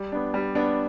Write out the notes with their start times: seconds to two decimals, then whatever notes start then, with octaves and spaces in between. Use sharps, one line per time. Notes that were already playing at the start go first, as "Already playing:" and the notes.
Already playing: G3
0.12 B3 D4
0.34 G3
0.55 B3 D4